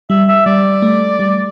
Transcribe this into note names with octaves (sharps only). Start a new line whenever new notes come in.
G3 E5
E5
G3 D5
A3
G3